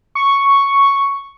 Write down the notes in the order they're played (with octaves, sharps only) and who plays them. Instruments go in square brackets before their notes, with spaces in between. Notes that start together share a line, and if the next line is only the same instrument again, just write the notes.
[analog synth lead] C#6